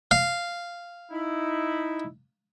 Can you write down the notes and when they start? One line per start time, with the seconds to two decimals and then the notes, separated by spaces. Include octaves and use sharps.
0.11 F5
1.11 D#4 E4